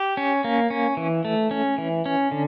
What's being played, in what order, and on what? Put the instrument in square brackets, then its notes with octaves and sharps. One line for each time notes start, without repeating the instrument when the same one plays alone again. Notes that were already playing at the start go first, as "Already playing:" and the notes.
Already playing: [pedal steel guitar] G4
C#4
A#3
C#4
E3
A3
C#4
E3
C#4
D3